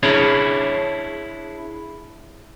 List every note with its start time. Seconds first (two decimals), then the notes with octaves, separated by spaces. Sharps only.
0.03 D4 E4 G#4 C#5